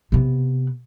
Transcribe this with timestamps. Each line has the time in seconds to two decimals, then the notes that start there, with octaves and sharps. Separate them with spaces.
0.12 C3 B3